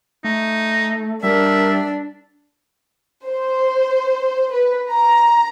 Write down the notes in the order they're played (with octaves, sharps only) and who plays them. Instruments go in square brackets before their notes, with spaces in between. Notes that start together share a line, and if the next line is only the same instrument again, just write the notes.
[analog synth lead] A3 [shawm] D#4
[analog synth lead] G3 [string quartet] D4 [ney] A#4 [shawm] E5
[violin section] C5
B4
A#5